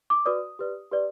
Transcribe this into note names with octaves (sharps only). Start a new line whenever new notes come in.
D6
F#4 B4 D5 D#6
G4 B4 D5
G4 B4 D5